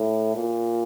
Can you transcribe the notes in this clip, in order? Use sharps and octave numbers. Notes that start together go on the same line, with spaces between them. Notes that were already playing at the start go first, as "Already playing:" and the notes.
Already playing: A2
A#2